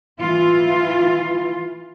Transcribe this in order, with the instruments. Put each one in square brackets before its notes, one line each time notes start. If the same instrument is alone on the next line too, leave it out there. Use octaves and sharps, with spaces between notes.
[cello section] E3 F4